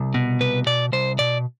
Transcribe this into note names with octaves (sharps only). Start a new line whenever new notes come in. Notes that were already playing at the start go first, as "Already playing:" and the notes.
Already playing: C2
B2
C2 B4
B2 D5
C2 C5
B2 D5